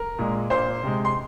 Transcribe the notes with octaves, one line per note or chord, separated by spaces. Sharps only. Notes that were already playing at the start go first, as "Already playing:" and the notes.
Already playing: A#4
A#2 G#3
A#2 A#3 C5 C6
C3 G#3
C6